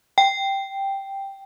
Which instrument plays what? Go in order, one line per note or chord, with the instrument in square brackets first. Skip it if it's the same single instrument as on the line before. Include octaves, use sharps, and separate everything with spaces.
[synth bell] G5